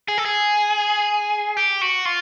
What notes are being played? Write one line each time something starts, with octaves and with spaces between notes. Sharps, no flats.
G#4
A4
G#4
G4
F#4
F4